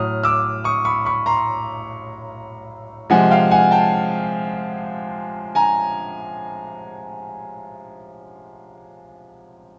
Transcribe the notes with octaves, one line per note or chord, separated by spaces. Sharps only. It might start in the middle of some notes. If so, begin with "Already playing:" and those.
Already playing: A2 F#3 D#6 F6
D6 E6
C#6 D#6
B5 C#6
B5 C#6
A#5 C6
C3 F3 G#3 F#5 G#5
F5 G5
F#5 G#5
G5 A5
G#5 A#5